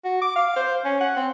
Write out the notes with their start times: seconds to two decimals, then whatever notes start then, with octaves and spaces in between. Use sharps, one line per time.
0.05 F#4
0.22 D6
0.36 F5
0.56 C5
0.85 C#4
1.00 F#5
1.16 C4